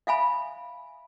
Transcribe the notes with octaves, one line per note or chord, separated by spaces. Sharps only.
E5 F5 G#5 B5